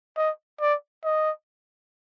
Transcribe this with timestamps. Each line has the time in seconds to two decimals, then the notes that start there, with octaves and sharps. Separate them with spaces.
0.17 D#5
0.61 D5
1.04 D#5